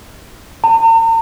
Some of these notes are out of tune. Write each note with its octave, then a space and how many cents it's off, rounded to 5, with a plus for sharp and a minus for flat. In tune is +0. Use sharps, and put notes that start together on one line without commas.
A#5 -45